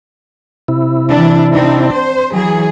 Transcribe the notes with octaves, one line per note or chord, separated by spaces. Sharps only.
C3 E4
E3 D4
C4 D4 D#4
C5
E3 F#3 G#4